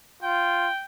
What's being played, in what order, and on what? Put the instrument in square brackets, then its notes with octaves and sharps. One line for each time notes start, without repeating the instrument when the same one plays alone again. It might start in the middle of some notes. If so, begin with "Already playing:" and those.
[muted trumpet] F4 [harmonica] G5